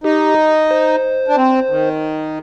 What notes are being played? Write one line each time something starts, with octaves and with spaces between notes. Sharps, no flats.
D#4 G4
C5
D4
C4
D#3